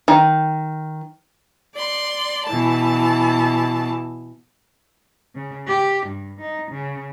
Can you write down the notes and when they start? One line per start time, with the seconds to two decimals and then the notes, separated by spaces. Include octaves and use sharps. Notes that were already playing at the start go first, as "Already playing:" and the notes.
0.08 D#3
1.74 D5 C6
2.47 B2 E3 A5
5.35 C#3
5.67 G4
6.07 G2
6.41 D#4
6.71 C#3